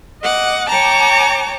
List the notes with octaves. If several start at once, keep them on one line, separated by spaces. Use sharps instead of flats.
D#5 F#5 D6
C#5 G5 A5 A#5 D6